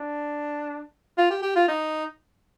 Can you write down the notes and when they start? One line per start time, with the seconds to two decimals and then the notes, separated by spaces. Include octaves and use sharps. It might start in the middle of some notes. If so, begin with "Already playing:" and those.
Already playing: D4
1.18 F4
1.31 G4
1.42 G4
1.56 F4
1.68 D#4